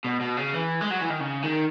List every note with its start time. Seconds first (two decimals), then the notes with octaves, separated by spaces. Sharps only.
0.05 B2
0.20 B2
0.37 C#3
0.53 E3
0.81 G#3
0.91 F#3
1.01 E3
1.10 D#3
1.20 C#3
1.43 D#3